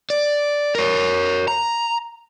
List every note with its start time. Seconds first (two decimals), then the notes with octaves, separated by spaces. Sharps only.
0.10 D5
0.75 A#4 C#5
1.48 A#5